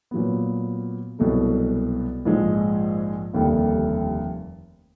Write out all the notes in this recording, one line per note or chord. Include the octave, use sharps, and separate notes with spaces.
A#2 F#3 B3
C2 B2 F#3 A3
A#1 G#2 F3 G#3
F1 D#2 D3 G3